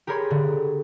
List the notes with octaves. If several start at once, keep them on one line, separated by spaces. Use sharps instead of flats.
G4 G#4 A#4 C#5 B5 C6
D3